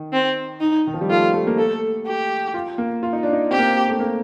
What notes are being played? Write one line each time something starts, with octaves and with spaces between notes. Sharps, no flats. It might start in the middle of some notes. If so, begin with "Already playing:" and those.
Already playing: D#3
C4
D#4
D#3
F3
G3
A3 F4
A3
A#3
A3 A4
G4
F4
A#3
F4
D#4
D4
D#4
C4 G4
A#3
C4
A3
A#3